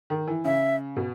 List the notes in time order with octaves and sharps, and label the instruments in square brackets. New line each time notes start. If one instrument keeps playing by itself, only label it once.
[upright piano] D#3
E3
[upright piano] C#3 [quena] E5
[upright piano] B2